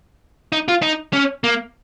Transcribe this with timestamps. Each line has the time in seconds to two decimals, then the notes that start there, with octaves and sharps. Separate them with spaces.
0.52 D#4
0.68 F4
0.82 D#4
1.13 C#4
1.44 A#3